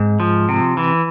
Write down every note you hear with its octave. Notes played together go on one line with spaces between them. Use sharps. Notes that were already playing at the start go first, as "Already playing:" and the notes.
Already playing: G#2 C4
F3
C3
E3